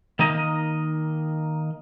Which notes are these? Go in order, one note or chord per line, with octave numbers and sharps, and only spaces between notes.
D#3 A#3 D#4 D#5